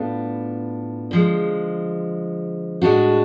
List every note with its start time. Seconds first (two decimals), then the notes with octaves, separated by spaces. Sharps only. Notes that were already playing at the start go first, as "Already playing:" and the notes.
Already playing: A2 B3 D4 F4
1.11 D3 F3 G#3
2.82 A2 G#3 D4 F#4